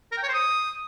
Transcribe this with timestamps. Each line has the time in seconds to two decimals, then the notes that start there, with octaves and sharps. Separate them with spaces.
0.12 A#4
0.17 G5
0.23 C#5
0.28 C5
0.34 D#6